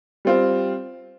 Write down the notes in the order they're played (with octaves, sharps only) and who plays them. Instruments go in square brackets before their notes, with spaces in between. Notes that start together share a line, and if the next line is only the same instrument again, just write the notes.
[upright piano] G3 C4 F4